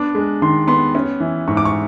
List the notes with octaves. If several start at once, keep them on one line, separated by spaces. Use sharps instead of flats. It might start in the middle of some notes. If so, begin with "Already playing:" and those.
Already playing: B3 D4
G#3
D#3 C6
B3 C6
C#4
E3
G#2 C#6
D6
C#6